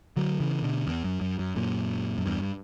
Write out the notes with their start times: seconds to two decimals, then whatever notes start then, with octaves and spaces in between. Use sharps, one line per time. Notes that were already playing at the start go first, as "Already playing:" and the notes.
0.16 D3 F#3
0.40 C#3 E3
0.63 B2 D3
0.87 E2
1.04 F#2
1.21 F#2
1.39 F#2
1.56 F#2 A#2
2.18 F#2
2.26 E2 G2